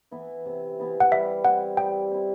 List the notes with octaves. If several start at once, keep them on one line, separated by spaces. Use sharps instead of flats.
E3 B3 E4
C3
E3 B3 E4
F#5
G3 E5
C4 E4 F#5
G3 G5
C4 E4